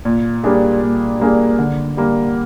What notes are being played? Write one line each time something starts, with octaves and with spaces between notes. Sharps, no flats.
A#2
G3 A#3 D4 G#4
A#2
G3 A#3 D4 G#4
D3
G3 A#3